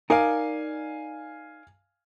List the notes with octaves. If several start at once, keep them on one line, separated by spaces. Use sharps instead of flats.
D#4 A#4 D5 F5 G#5